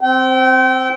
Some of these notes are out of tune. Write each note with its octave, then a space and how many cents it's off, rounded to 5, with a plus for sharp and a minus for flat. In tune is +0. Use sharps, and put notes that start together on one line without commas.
C4 +0 G5 -35